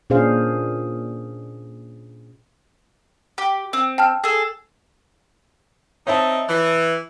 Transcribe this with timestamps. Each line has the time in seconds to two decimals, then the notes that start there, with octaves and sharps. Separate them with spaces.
0.10 A#2 C#4 D4 G#4 C5 F5
3.38 G4
3.73 C4
3.98 G5 A5 F6
4.24 G#4 A4
6.07 C4 D#4 C#5 E5 A5
6.49 E3